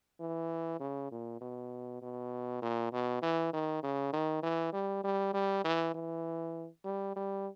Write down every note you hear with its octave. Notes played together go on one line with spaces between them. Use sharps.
E3
C#3
A#2
B2
B2
A#2
B2
E3
D#3
C#3
D#3
E3
G3
G3
G3
E3
E3
G3
G3